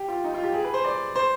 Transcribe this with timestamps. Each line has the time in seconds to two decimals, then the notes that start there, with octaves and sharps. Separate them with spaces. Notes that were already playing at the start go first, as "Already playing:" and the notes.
Already playing: G4
0.08 F4
0.24 D#4
0.34 F4
0.44 G4
0.54 G#4
0.64 B4
0.74 C5
0.84 D5
1.16 C5